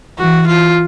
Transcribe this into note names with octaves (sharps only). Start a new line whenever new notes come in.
E3 F#4
F4